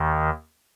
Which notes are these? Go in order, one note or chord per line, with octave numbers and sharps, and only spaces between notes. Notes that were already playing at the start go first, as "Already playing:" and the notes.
Already playing: D#2 D#3